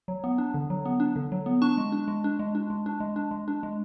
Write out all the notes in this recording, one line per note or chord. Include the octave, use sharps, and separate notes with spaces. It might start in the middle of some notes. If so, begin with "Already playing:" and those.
F#3
B3
D4
D3
F#3
B3
D4
D3
F#3
B3
D4 A5 C#6
G#3
D4
G#3
D4
G#3
D4
G#3
D4
G#3
D4
G#3
D4
G#3